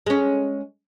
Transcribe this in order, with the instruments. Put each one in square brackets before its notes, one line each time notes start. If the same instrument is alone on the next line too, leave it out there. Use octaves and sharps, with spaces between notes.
[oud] G#3 C#4